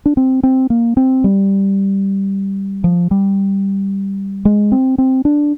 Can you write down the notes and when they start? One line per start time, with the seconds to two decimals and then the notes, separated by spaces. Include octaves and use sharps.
0.06 D4
0.17 C4
0.43 C4
0.70 A#3
0.97 C4
1.24 G3
2.84 F3
3.11 G3
4.45 G#3
4.72 C4
4.98 C4
5.25 D4